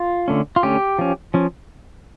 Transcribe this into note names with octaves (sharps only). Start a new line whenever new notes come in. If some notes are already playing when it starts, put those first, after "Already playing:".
Already playing: F4
D3 A3 C#4
F4
D3 A3 C#4 G4
F3 C#4
F3 C#4